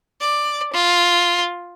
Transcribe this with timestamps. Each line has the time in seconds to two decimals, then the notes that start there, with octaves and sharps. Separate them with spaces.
0.21 D5
0.73 F4